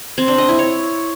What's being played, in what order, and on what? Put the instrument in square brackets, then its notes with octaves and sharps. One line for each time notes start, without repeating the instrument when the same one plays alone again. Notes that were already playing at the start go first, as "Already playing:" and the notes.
[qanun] C4
D4
D#5
E4
C#5